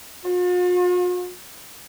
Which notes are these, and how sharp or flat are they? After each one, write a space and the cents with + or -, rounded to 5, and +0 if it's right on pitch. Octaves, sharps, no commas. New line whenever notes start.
F4 +45